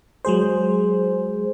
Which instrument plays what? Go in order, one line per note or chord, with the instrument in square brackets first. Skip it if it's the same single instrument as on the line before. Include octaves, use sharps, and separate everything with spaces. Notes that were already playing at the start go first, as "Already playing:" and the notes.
[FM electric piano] F#3 G#3 G#4 C5